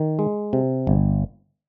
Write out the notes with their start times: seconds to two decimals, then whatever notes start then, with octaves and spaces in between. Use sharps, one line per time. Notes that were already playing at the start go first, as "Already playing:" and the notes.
Already playing: D#3
0.19 G#3
0.53 C3
0.87 G1